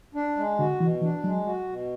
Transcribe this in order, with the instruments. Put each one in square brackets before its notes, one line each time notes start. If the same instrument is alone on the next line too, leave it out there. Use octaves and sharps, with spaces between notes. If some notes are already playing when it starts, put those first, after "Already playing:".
[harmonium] D4
G#3
[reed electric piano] D3 [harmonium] F#4
[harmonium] B2 [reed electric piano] E3
[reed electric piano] E3 [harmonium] D4
[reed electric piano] F#3 [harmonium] G#3
[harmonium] F#4
B2